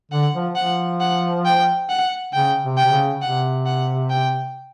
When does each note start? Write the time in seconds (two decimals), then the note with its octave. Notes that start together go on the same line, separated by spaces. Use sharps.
0.11 D3 F#5
0.34 F3
0.56 F3 F#5
1.00 F#5
1.45 G5
1.89 F#5
2.33 C#3 G5
2.63 C3
2.77 G5
2.85 C3
2.92 C#3
3.22 C3 F#5
3.66 F#5
4.10 G5